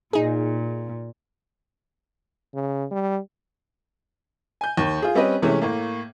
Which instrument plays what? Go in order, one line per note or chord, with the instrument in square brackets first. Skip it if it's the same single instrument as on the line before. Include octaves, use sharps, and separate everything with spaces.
[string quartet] A#2 [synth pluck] D#4 G#4
[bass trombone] C#3
G3
[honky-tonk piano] G#5 G6
D#2 D#3
F4 G#4
G3 C4 C#4 G4 B4 D#5
C3 E3 G#3 A3 C#4
A2 A#3